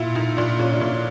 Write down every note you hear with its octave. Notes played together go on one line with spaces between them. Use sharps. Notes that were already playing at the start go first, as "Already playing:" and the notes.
Already playing: A#2 E4
A#2 D#4
A#2 D4
A#2 C#4
D4
A#2 C#4